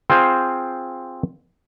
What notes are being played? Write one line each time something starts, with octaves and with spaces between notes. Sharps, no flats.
C4 F4 G#4 C5